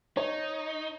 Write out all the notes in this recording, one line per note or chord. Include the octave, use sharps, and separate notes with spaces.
D#4 C#5